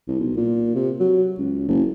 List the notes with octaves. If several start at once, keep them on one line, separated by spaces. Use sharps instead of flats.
C2
B1
A#2
C3
F#3
C#2
F#1